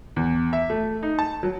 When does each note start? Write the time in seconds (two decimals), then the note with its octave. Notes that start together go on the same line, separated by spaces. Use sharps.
0.16 E2
0.53 E5
0.70 A3
1.03 D#4
1.19 A5
1.43 F#3